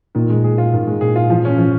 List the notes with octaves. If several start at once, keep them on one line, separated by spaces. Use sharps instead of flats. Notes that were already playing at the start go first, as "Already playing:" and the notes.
A#2 D#3
G#3
G#4
F4
G#2 D#3
G#3
A#2 G#4
F4
F3
C#4
F3